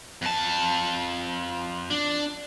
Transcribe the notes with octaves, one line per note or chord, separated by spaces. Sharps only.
F2 A5
D4